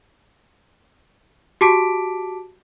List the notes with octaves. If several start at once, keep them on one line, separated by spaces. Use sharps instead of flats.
F#4 G4 A5 D6 B6 D7